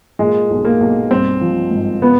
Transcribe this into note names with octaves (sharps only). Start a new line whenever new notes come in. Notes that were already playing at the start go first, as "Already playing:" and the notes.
A#2 G#3
B1
A#3
B1
G2 C4
F3
G#1
C#3 B3